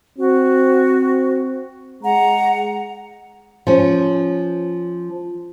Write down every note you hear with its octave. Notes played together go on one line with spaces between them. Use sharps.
C4 F#4
G#3 F#5 A#5
F3 C#4